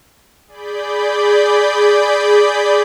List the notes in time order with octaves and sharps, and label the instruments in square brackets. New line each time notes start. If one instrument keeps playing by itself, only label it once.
[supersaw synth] G#4 D5 B5 G6